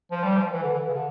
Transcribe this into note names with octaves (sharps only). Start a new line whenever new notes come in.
F3
G3
F3
E3
D3
E3
C#3
D3